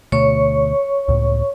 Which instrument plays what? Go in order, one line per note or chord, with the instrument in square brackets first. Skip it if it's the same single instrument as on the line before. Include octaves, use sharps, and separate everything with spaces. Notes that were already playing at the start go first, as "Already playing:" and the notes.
[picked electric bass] D2 B2 A3 [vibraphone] C#5 C#6
[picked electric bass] C#2 A2